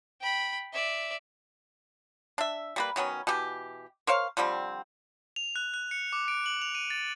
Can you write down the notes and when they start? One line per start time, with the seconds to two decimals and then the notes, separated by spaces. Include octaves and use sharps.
0.21 G5 B5
0.73 D5 E5
2.38 D4 E5
2.76 G3 A#3 B4
2.96 D#3 F#3 B3 C#4
3.27 B2 E3 G4
4.07 A#4 C5 C#5 F5
4.37 D3 F3 G3 C4
5.36 F7
5.56 F#6
5.74 F#6
5.91 C#7
6.13 D6
6.28 D7
6.46 F#7
6.62 F7
6.75 D#7
6.90 A6